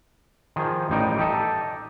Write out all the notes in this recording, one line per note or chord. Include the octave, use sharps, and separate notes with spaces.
D#3 F3 G#4
A1 G3 D#4 G5
D#4 G4 A4 D#5